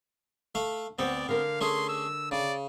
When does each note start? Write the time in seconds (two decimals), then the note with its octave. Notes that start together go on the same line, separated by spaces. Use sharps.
0.55 A3 F5
0.99 D2 B3 C4 C5 D5 F#5
1.29 D3 A#4 F5
1.61 A3 C#4 G#4 C6
1.89 E6
2.31 C#3 D5